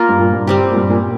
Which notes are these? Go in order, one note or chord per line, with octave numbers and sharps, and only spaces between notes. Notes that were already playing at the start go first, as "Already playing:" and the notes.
Already playing: A#3 F4 A#4
G2
A#2
G2
G3 C4 G4
A#2
G2
A#2